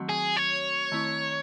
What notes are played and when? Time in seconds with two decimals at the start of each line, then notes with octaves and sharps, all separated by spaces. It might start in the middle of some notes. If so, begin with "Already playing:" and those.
Already playing: D#3 F#3 A3 C4 F#4
0.09 G#4
0.37 C#5
0.92 D#3 A3 C4 E4